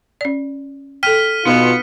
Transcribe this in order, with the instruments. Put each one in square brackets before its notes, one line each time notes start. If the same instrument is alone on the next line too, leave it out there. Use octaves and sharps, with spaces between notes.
[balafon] C#4 D5
[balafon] A4 G5 [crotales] F6 B6 D#7
[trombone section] B2 F4 [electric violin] B3 C#7 [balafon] D#4